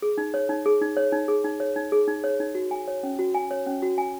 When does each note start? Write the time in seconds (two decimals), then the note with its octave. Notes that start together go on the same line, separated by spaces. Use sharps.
0.02 G#4
0.18 D#4
0.34 C#5
0.49 D#4
0.66 G#4
0.81 D#4
0.97 C#5
1.12 D#4
1.28 G#4
1.44 D#4
1.60 C#5
1.76 D#4
1.92 G#4
2.07 D#4
2.24 C#5
2.40 D#4
2.55 F#4
2.71 G#5
2.88 C#5
3.03 C#4
3.19 F#4
3.35 G#5
3.51 C#5
3.66 C#4
3.82 F#4
3.98 G#5